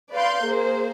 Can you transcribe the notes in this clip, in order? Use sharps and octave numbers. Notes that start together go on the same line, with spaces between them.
B4 D5 F5 C6 G6
A#3 G#4 C5